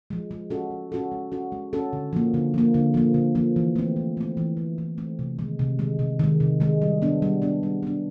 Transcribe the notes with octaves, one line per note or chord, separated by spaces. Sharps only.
F3 G#3
G#3
C#4 F#4 A4
G#3
C#4 F#4 A4
G#3
C#4 F#4 A4
G#3
C#4 F#4 A4
D3
F3 A#3
D3
F3 A#3
D3
F3 A#3
D3
F3 A#3
E3
A3 C4
E3
A3 C4
E3
A3 C4
E3
A3 C4
C3
D#3 G#3
C3
D#3 G#3
C3
D#3 G#3
C3
D#3 G#3
G3
B3 D4
G3
B3 D4
G3
B3 D4